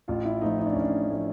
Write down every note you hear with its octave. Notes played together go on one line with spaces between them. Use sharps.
A1 F4
E4
A2 F3 A3 D#4
D#4
D4
A1 C#4
D4
A2 F3 A3